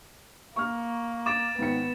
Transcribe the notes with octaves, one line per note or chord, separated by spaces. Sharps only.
A#3 C#6 F6
D6 A6 D7 E7
G#1 D#3 B3 C#7